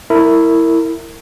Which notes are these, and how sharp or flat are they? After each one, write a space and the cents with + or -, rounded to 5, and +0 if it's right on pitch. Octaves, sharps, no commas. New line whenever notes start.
E4 +0 A#4 -25